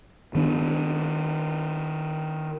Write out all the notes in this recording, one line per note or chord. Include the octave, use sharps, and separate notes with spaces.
D#3 B3 D4